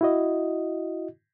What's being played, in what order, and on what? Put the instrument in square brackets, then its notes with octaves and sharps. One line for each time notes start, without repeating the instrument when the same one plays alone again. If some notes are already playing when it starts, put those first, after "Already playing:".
[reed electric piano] E4 F#4 D#5